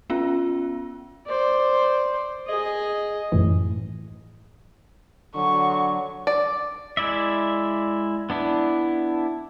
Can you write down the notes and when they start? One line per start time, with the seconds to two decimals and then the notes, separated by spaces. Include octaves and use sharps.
0.10 B3 C#4 F4
1.26 C5 D5
2.47 G#4 D#5
3.32 F#2 A2 E3
5.36 D3 F#3 C#6
6.27 D5
6.97 G#3 E4 D5 E5
8.30 B3 D4 E4